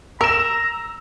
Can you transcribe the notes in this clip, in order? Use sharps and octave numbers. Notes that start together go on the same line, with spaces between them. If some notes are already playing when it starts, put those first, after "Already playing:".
A#4 A#5 E6 E7